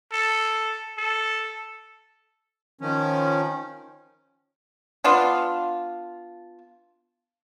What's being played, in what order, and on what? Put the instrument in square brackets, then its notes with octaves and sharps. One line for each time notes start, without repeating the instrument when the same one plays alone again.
[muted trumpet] A4
A4
[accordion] D#3 F3 C#4
[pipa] B3 D4 F4